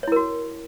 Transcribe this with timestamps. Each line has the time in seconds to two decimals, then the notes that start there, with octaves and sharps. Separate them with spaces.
0.03 C#5
0.08 E4
0.12 A#4
0.16 F#4